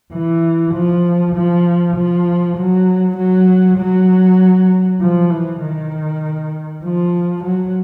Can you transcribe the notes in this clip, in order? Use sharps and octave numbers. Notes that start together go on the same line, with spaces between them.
E3
F3
F3
F3
F#3
F#3
F#3
F3
E3
D#3
F3
F#3